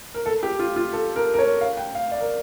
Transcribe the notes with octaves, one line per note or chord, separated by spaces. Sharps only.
A#4
A4
G4
F4
F4
A4
A#4
A#4
C#5
F5
G5
F5
D5
A#4